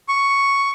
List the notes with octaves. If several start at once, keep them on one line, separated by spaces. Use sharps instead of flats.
C#6